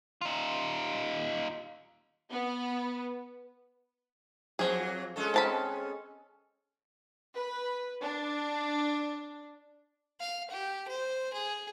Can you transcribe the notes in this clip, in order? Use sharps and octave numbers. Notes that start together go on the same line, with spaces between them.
D#4 F4
B3
F2 F3 F#3 G#4
G#3 C#4 A4
C4 A5 B5
B4
D4
F5
G4
C5
G#4